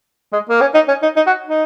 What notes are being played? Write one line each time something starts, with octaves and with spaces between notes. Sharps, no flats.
G#3
A#3
C#4
D#4
C#4
D#4
D#4
F#4
D#4